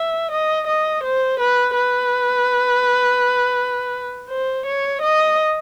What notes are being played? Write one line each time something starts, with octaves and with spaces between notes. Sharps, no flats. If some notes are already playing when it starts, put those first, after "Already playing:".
Already playing: E5
D#5
D#5
C5
B4
B4
C5
C#5
D#5